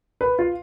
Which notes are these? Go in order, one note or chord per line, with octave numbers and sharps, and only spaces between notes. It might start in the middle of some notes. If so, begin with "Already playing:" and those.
B4
F4